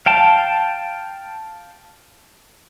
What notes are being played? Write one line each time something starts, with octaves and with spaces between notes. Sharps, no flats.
F5 G5 A5